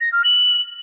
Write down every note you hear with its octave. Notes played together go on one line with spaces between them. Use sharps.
A#6
F6
F#7